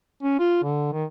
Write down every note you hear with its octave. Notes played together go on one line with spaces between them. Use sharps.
C#4
F4
D3
D#3